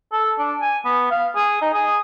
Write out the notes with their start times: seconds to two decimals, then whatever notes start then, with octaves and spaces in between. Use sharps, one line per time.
0.12 A4
0.38 D4
0.61 G#5
0.85 B3
1.11 F5
1.36 G#4
1.62 D#4
1.74 G#4